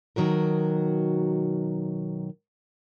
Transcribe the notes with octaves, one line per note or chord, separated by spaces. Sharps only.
B2 D#3 F#3 F#4 A#4